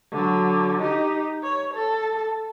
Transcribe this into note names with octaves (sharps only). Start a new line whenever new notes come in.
D3 F#3
D#4 G4
C#5
A4